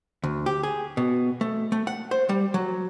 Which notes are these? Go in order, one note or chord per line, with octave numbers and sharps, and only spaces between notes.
D2
G4
G#4
B2
A3
A3
F#5
C5
G3
F#3